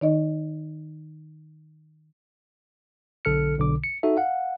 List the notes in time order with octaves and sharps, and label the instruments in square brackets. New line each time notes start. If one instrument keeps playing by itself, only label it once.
[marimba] D#3 D#4 D#5
[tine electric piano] B1 D3 A4 F6 C#7
B1 B2 D3 D6
C#7
D#4 F#4 A4 E5
F5 F#5